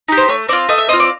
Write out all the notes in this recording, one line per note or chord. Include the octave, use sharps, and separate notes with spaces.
D#4 G4
C5
A3 C#5
C4 F4 D5
A3 D#5
E5
C4 F4 D#5
D5